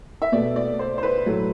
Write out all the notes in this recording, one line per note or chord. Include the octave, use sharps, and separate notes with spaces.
E5
B2 A3 D5
D5
C5
C5
B4
A2 F#3 A3